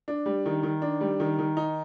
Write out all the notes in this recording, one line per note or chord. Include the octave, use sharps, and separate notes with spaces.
D4
G3
D#3
D#3
D4
G3
D#3
D#3
D#4